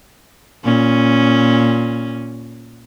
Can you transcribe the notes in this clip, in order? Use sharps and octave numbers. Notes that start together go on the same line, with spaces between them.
A#2 C#4